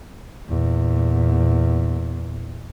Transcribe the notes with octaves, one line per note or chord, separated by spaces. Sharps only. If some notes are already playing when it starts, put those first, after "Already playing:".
E2 A#2